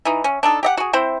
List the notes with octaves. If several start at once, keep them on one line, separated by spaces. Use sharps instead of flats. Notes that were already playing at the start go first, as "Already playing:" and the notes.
E3 D#4
C#4
D4 D#4 A4
G4 D#5 F#5
F#4 G#4
C4 E4 C5